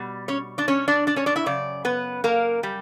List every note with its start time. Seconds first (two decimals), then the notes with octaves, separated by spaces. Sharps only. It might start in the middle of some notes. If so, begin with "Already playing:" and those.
Already playing: B2 G3
0.28 C#4 C#5
0.58 D4 D5
0.68 C#4 C#5
0.88 D4 D5
1.07 D4 D5
1.16 C#4 C#5
1.26 D4 D5
1.36 E4 E5
1.46 F#2 C#3 D5
1.85 B3 B4
2.24 A#3 A#4
2.63 G3 G4